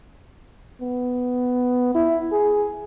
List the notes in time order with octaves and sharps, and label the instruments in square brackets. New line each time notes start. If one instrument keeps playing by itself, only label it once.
[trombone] B3
E4
G#4